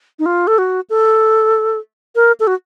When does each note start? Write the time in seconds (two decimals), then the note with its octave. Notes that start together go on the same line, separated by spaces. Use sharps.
0.19 D#4
0.26 F4
0.47 A4
0.58 F#4
0.90 A4
2.15 A#4
2.40 A4
2.47 F#4